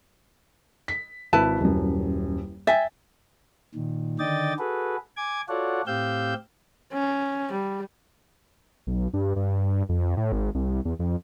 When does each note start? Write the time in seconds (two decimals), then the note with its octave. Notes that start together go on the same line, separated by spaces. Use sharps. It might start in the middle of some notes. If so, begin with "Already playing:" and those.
0.88 B6
1.33 G#1 E4 B4 A5
1.60 D#1 F#2
2.67 E5 G5 G#5 A6
3.75 A#2 D#3
4.19 D3 D#3 D5 D#5 G5 A6
4.59 F#4 G#4 A4 B4
5.17 G#5 D6 G#6
5.49 F4 F#4 A4 C#5 D5 F#5
5.87 A2 C4 G4 F5 E6 G6
6.93 C#4
7.52 G3
8.87 B1
9.14 G2
9.36 G2
9.89 F2
10.17 A2
10.32 G#1
10.55 C2
10.85 E2
10.99 F2